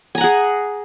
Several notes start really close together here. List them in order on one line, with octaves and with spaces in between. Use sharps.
G#5 A#5 F#5 G#4